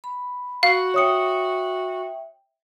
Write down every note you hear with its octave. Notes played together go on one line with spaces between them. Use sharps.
B5
F#4 F5
C#5 E5 G5 D#6 C#7